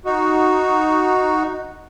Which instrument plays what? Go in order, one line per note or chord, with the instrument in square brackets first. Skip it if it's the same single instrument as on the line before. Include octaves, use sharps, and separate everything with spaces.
[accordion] D#4 F#4